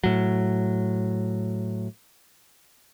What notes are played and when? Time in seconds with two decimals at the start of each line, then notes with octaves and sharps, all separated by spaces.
0.04 A2 F#3